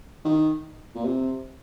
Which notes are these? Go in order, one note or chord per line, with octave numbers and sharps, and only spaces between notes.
D#3
A#2
C3